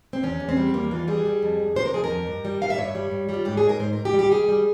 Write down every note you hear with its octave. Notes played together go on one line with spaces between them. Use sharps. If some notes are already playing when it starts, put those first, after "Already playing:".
C4
E2 C#4
E2
C4
G3
E2 A#3
E3 F4
G3 G#4
G3
F2
F2
C3 C5
A#4
F2 G#4
A#4
F2
G2
G3
G2 F5
E5
G2 C#5
G3
G2
G3
F4
G#2 G4
G#4
G#2
A#4
G#2 C5
G#2 A#4
G4
G3
G4
G3 G#4
G3